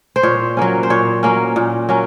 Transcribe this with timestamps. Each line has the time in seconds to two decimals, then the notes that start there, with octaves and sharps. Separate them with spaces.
0.16 C5
0.23 A#2 C#5
0.57 F#3 A#3 C#4
0.83 C5
0.90 A#2 C#5
1.23 F#3 A#3 C#4
1.56 A#2
1.89 F#3 A#3 C#4